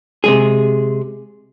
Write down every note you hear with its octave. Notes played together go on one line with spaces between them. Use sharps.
C3 G#3 G#4